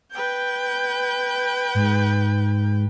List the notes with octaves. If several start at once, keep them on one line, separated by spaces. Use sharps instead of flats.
B4 G5 G6
G#2